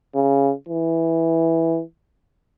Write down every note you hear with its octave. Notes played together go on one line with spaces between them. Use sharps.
C#3
E3